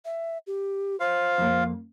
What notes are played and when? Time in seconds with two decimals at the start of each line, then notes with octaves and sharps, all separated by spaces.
0.05 E5
0.47 G4
1.00 F4 C5 F5
1.38 F2 A#3